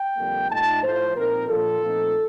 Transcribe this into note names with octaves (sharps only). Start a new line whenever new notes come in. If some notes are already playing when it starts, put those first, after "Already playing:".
Already playing: G5
F2 D3 G3 A#3
A#2 A3 D#4 A5
A2 F3 A3 C5
A#2 F3 C4 D#4 A#4
A#2 F3 A#3 D4 F4 A4
A#2 F3 A3 C4 D#4